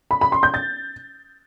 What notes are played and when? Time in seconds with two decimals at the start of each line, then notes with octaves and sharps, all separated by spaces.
0.11 B5
0.21 B5
0.32 C6
0.43 G6
0.54 A6